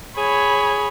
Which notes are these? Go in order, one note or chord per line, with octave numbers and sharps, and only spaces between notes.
G#4 C#5 B5